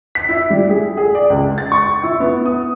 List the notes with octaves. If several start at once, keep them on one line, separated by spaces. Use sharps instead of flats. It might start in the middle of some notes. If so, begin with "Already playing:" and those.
B6
E4
G3
G#4
G#4
D5
C#2
A6
C#6
E4
B3
D#6